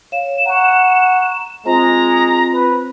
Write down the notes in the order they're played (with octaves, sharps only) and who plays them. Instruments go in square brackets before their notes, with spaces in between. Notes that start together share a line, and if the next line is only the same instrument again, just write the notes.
[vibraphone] C#5 F5 [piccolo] E7
[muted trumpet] F#5 [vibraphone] A#5 C#6
[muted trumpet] G#3 [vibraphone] C4 F4 C5 [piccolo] A#5
[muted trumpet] B4